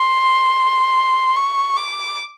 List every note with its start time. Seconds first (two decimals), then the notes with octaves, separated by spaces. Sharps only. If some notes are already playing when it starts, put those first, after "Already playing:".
Already playing: C6
1.36 C#6
1.77 D6